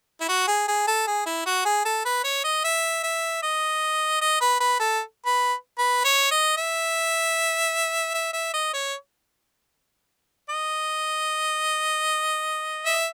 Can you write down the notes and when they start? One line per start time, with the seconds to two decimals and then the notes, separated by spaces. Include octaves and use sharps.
0.21 E4
0.28 F#4
0.47 G#4
0.68 G#4
0.87 A4
1.07 G#4
1.26 E4
1.46 F#4
1.65 G#4
1.85 A4
2.05 B4
2.24 C#5
2.44 D#5
2.64 E5
3.03 E5
3.42 D#5
4.21 D#5
4.41 B4
4.60 B4
4.79 A4
5.26 B4
5.78 B4
6.04 C#5
6.31 D#5
6.57 E5
8.14 E5
8.33 E5
8.54 D#5
8.73 C#5
10.49 D#5
12.85 E5